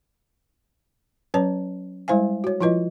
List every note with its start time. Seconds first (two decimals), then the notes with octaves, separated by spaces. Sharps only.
1.34 F#3 C#4 B4 C#5 A5
2.08 G3 G#3 E4 C5 F5 G#5
2.44 F#4 C#5
2.60 F3 E4 F4 B4 D#5